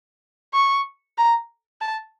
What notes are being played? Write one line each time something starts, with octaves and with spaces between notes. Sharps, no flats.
C#6
A#5
A5